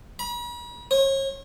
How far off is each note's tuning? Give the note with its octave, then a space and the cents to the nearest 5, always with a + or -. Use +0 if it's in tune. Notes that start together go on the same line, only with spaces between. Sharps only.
B5 -45
C#5 -35